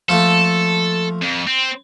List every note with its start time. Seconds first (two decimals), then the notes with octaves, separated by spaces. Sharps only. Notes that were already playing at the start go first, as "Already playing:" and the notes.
0.09 F3 A3 A#3 A4
1.22 F2
1.47 C4